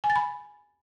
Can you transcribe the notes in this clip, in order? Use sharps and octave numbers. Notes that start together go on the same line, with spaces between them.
G#5
A6
B5